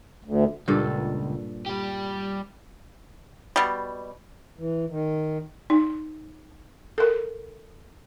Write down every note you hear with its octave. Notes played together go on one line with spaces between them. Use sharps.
D2
C#2 G2 A#2 A4
G3 G4
B2 G3
E3
D#3
D#4
A4 A#4